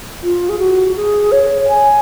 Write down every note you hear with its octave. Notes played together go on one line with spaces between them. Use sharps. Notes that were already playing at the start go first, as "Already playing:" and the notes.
F4
G#4
F#4
G#4
C#5
G#5